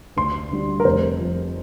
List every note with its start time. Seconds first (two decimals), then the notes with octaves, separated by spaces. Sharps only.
0.17 D2 C6
0.52 D3 G3
0.80 A#4
0.85 F1 C5
1.19 F2 F3